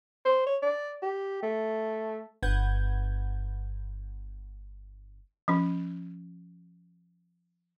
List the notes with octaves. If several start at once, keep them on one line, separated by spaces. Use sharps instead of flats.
C5
C#5
D5
G4
A3
G1 B4 F#5 G6 G#6
F3 C#4